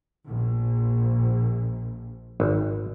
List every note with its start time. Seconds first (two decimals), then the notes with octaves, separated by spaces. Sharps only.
0.28 A#1
2.40 G#1